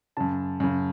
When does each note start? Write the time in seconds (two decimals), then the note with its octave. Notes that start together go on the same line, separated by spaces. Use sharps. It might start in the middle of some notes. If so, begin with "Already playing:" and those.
0.17 F#2 C#3 A5
0.60 F#2 C#3